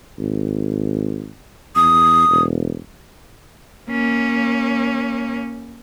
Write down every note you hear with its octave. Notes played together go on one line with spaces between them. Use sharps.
G#1
E2 D#6
E1
A#3 C#4